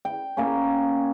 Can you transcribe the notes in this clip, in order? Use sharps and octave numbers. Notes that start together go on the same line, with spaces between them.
G5
A#3 C#4